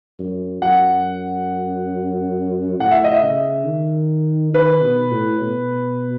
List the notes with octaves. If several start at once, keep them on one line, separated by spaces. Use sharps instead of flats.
F#2
F#2 F#5
A2 F#5
E5
D#5
E5
C#3
D#3
D#3 B4
B2
A2
B2